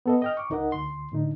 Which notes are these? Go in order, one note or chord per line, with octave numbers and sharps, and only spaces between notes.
B3 A4 D#5
D#5 G5 F6
C#6 D6
C#2 D#4 A#4 D#5 F#5
D2 C6
A2 D3 D#4